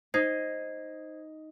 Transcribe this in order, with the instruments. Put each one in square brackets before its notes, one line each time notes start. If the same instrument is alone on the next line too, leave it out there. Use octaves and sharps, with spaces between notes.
[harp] D#4 [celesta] C5 G#6 C7